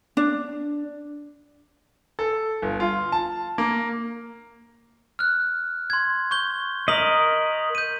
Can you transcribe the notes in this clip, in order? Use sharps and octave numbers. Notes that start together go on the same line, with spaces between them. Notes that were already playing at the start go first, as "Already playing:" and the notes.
D4
A4
G1
F4
A5
A#3
F6 F#6
C6 G#6
C#6 G6 G7
A#4 D#5 D#6 B6 F#7
G6 D#7